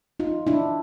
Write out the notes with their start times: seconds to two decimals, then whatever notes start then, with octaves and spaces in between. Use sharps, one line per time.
0.20 D#4 F4
0.47 D4 E4